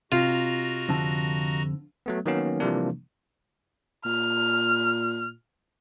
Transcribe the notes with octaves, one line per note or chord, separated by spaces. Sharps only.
C3 F4 F#4 D#5 A#5
F2 D3 A5
F#3 A3 B3
D#3 F#3 A#3 B3 C#4
C3 E3 F3 G3 A#3 D4
A#2 F6